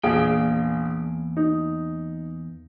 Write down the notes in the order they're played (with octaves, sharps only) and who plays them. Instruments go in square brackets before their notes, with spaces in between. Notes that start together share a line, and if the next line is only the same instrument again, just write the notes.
[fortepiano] A#1 G#4 F5 [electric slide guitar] E2 A#3 G5
[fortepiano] D#4